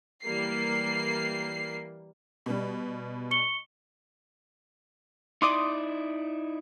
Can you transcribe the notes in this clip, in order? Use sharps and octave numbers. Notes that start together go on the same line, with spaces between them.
E3 G3 A#3 C7
B2 G3
C#6 C#7 G7
D#4 E4 D5 C6 D6 D#6